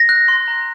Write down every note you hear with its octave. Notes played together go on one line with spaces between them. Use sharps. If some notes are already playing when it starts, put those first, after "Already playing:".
Already playing: A#6
F#6
C6
A#5